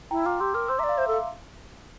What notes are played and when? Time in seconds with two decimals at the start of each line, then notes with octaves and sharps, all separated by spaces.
0.11 E4 G5 A#5
0.26 F4 A#5 D6
0.40 G4 C6 E6
0.54 A#4 D6 F6
0.68 C5 C6 E6
0.79 E5 A#5 D6
0.84 D5
0.89 F5
0.98 C5 E5
1.08 A4
1.13 F5